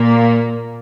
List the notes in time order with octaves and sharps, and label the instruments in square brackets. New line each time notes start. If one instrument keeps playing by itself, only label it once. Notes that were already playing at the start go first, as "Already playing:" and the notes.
Already playing: [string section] A#2 A#3